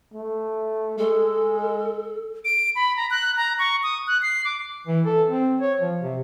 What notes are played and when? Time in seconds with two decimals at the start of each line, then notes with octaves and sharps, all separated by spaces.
0.14 A3
0.98 G#3 A4
2.45 D7
2.76 B5
2.97 A#5
3.10 F#6
3.37 A#5
3.59 C#6
3.83 D#6
4.07 F#6
4.22 C7
4.45 D6
4.87 E3
5.06 A4
5.28 C4
5.61 C#5
5.81 F3
6.02 C3